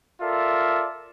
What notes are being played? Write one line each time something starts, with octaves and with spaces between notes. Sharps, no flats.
F4 A4 A#4 D5 E5